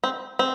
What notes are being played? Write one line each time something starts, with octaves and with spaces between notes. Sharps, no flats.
C4
C4